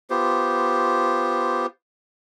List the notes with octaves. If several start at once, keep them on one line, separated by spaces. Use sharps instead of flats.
B3 F4 G4 C5